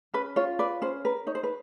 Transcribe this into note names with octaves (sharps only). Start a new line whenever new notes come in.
C#4 B4
F4 C#5
B4 D5
C#4 C5
A#4 B4
D#4 C#5
C5
B4